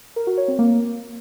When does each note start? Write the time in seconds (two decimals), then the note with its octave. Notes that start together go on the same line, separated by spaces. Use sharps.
0.16 A#4
0.27 F#4
0.38 C#5
0.48 C4
0.59 A#3